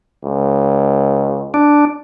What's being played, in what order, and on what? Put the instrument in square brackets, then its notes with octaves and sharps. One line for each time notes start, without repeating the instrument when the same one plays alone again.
[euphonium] C#2
[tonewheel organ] D4